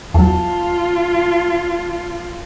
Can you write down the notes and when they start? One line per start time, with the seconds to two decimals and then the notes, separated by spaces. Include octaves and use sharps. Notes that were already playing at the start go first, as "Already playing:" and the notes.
0.14 E2 F#3 F4 A5